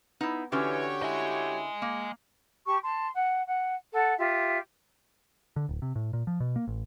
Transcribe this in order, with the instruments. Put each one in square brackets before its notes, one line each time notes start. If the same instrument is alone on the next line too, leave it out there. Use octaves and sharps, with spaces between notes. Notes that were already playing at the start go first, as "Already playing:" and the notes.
[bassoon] B3 [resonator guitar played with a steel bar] D#4 E4
[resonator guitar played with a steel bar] D3 C#4 [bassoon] E3 [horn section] F#4 G4 C#5
[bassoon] E4 [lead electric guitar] D#5 G#5
[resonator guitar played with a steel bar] A#3
[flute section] G4 A5 C#6
A5 C6
F#5
F#5
A4 F#5
F4 G4 E5
[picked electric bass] D3
D1
C3
A2
A#2
F3
B2
A#3
A1